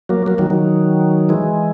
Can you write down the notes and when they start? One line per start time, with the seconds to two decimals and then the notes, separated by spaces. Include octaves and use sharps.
0.09 F#3 A#3
0.26 F#3 A#3
0.38 D#3 F#3
0.50 D#3 F#3
1.29 E3 G#3